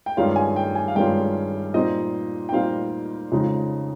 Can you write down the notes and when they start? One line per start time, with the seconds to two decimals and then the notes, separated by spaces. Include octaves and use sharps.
0.06 G5
0.17 G2 D#3 G#3 C#4 F4 F5
0.36 G#5
0.56 G5
0.75 G#5
0.88 F5
0.95 G2 D#3 G#3 C#4 F4 G5
1.74 A#2 G3 C4 D#4 D#5
2.49 G5
2.52 A#2 G3 C4 D#4 F5
3.32 F2 C#3 G#3 D#4